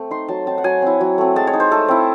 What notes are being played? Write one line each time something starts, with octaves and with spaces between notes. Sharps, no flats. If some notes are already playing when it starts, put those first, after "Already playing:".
Already playing: A3 C4
D#4 C6
F#3 A5
C4 D#4 A5
F#5
F#3 G#5
C4 E4
F#3
A3 C4
G#3 A5
C#5
D#4
C5
A3 A4
C4 E4